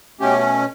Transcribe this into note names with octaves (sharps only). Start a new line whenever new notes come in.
B2 A3 C#4 G4